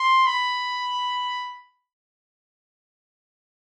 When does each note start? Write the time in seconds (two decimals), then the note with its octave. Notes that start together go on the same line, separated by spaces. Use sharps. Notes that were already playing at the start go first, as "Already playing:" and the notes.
Already playing: C6
0.26 B5